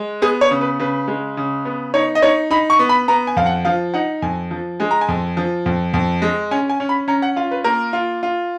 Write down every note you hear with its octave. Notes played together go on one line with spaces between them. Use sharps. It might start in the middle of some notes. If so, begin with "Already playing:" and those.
Already playing: G#3
B3 G#4
C#5
C#3
B4
C#3 B4
G#3
C#3
B3
D#4 C#5
D#5
D#4 C#5
D#4 B5
C#6
B3
B5
B3 A#5
G#5
F2 F5
F#5
F3 F5
D#4 F#5
F2 G#5
F3
G#3 G#5
A#5
G#5
F2
F3
F2
F2
G#3
C#4 G#5
G#5
C#4
B5
C#4 A#5
F#5
F4 F5
B4
A#3 A#4
F4
F4